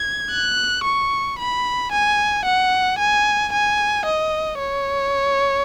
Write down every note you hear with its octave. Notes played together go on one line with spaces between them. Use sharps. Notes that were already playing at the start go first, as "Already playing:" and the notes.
Already playing: G#6
F#6
C#6
B5
G#5
F#5
G#5
G#5
D#5
C#5